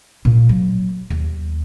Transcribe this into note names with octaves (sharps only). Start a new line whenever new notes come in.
A#2
F#3
D#2